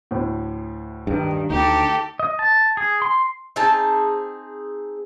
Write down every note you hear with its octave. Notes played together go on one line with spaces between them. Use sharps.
D2 A2
G2 D#3
D2 D#4 G4 A4
D#5
A5
G#4
C6
C4 D#4 G#4 A5